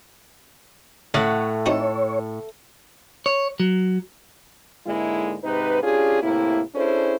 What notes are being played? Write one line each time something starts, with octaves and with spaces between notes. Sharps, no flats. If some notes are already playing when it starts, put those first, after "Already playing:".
A2 C#3 A3 F#5
C4 D#4 F#4 A4 C#5
C#5
F#3
G#2 D3 G#3 A#3 D#4 E4
G#2 C3 D#4 B4
C#4 D4 F4 G4 G#4
A2 C3 A#3 E4
C#4 D4 E4 G#4 A4 C5